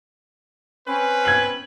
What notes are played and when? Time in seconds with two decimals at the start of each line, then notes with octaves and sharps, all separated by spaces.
0.87 C4 C#4 B4
1.25 G#6 F#7